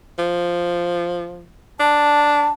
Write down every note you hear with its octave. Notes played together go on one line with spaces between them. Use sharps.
F3
D4 A5